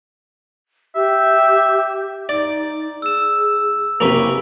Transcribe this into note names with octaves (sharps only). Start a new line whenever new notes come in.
G4 E5
D#4 D5
G#4 E6 E7
F#1 C3 A#3 C#4 G4 B4